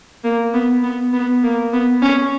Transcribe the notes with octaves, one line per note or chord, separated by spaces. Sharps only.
A#3
B3
B3
B3
A#3
B3
C#4